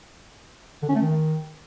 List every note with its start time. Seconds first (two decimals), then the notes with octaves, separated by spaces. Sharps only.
0.83 D3
0.89 C#4
0.95 A3
1.02 D#3